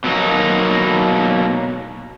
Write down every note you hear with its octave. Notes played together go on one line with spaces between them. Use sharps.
B2 F#3 A#3 D#4